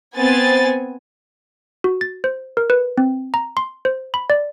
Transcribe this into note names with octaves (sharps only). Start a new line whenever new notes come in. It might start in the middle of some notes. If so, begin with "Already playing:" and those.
B3 C4 G#5 A6
F#4
A6
C5
A#4
B4
C4
A#5
C6
C5
B5
D5